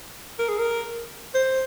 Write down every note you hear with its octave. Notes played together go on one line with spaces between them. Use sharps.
A#4
G#4
A#4
C5